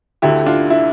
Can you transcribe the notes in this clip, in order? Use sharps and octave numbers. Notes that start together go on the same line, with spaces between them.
D2 D3 E4 G4
D4 F4
E4